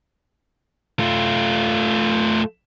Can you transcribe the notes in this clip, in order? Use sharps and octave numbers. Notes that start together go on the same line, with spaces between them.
A3 F4